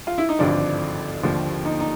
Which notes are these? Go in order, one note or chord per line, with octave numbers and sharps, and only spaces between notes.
F4
E4
D#4
G#1 G2 D3 F3 D4
D#2 D3 F3
D#4
D#4